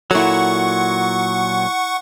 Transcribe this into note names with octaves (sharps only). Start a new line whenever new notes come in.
A#2 F#3 E4 A4 F#5 C#6